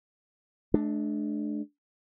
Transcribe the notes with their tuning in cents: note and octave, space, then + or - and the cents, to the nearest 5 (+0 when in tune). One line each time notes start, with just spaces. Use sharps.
A3 -45 D4 +10